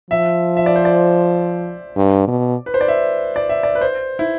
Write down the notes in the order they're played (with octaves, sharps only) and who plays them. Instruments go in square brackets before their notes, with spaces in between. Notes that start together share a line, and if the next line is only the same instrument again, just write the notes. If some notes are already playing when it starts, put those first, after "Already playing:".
[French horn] F3 [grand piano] E5
[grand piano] E5
D5
C5
D5
[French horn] G2
B2
[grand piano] B4
C5
D5
E5
D5
E5
D5
B4
C5
E4